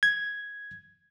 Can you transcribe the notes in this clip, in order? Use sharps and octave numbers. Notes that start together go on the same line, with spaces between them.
G#6